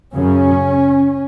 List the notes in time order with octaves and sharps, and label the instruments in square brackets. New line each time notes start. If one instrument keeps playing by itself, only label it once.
[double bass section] F#2 C#3 C#4